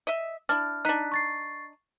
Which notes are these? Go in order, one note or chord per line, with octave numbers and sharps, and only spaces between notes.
D#5 E5
D4 E4 F6
D4 D#4 F#6 B6
C#6 A6 C7